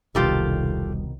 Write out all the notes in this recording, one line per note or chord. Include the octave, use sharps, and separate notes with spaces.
E1 C2 B2 D#3 G3 F4 G4 A4